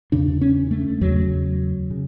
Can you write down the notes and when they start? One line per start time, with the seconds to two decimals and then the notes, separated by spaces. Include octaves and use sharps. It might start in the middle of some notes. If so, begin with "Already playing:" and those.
0.12 E2 C#3 D4
0.41 C#4
0.71 A3
1.01 E2 C#3 F#3
1.90 C#3